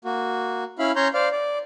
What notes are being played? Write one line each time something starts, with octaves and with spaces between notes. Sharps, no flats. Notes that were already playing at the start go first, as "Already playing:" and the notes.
A#3 F#4
C#4 E4 F5 B5
C#4 C#5 A#5 C6 G6
C5 D5 F5
D5